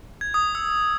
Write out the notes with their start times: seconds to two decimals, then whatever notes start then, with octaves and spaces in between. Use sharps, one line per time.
0.21 G#6
0.34 D#6
0.55 E6